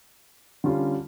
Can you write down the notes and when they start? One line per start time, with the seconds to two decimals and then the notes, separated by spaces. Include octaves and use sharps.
0.64 D3 G3 C#4 F4